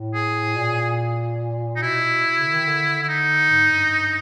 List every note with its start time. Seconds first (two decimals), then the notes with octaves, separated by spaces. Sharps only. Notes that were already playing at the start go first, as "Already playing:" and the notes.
Already playing: A2
0.15 G#4
0.57 A#2
1.76 D#4
1.82 B2 E4
2.39 C#3
2.46 D3
2.53 D#3
2.67 D3
3.02 E4
3.09 D#4
3.50 G#2
3.71 G2